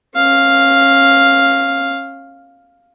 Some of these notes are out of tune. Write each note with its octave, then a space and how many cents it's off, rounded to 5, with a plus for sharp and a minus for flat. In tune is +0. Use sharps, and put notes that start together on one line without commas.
C#4 -30 F5 +0